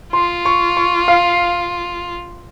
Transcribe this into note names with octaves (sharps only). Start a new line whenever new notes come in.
F4 C6
C#6
C#6
F5